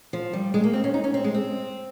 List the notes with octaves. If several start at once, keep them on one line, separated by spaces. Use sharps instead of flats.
F3
G3
G#3
A#3
C4
C#4
D#4
C#4
C4
G#3
C4